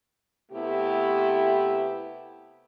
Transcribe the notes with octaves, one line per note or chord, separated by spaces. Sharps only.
C3 A3 B3 E4 G4